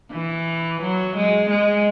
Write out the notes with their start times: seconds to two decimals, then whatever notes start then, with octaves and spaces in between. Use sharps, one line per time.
0.13 E3
0.82 F#3
1.16 G#3
1.50 G#3